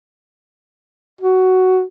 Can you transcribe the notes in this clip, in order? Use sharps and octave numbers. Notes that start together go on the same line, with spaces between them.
F#4